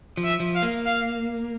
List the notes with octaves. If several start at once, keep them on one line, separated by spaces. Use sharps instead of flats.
F3
E5
F3
F5
A#3
F5